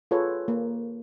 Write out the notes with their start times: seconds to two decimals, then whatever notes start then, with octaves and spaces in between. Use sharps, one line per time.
0.11 F4 G#4 A4 B4 C#5
0.48 A#3